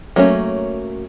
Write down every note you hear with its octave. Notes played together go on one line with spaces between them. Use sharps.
F#3 A3 A#3 C#4